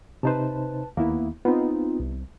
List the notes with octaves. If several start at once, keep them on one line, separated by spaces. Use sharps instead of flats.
C3 D#4 B4 C5 A5
D#2 A#3 B3 E4
B3 C4 D#4 F4
C2